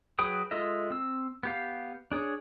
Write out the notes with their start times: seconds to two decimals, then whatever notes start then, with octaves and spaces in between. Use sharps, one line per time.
0.19 F#3 G#4 B4 G5 D#6
0.51 G#3 F4 A4 D#5 E5
0.90 C4 E6
1.43 B3 G4 F5
2.12 D4 G#4 C#5